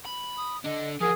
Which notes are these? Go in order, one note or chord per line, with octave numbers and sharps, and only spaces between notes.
B5
D#6
D4 A4 D#5
F3 F#4 G#4 A#4